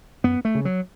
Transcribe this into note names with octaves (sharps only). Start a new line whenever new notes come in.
F#2 B3
A3
C#3
F#3